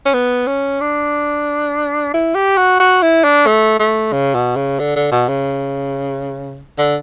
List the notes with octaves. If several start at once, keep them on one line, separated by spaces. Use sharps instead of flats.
C#4
B3
C#4
D4
E4
G4
F#4
F#4
E4
D4
A3
A3
C#3
B2
C#3
D3
D3
B2
C#3
D3